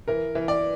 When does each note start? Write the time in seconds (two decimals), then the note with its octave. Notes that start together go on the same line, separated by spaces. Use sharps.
0.08 E3 A#4
0.35 E3
0.48 D5